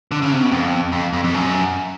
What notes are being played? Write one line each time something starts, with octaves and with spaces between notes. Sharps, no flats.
D3
C#3
C3
B2
F2
F2
F2
F2
F#2